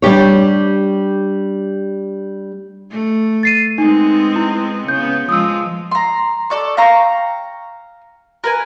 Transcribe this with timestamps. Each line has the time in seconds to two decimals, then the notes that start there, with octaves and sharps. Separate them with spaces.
0.02 G3 D4 G4 C#5
2.91 A3
3.43 A6 C7 D#7
3.78 G#3 B3 C4 D#4
4.36 E4
4.88 C#3 B3 G6
5.29 F3 G#3 D#6 E6
5.91 A#5 C6
6.50 A4 D5 C#6
6.77 F5 G5 A#5 C#6
8.44 A#4 B4 G#5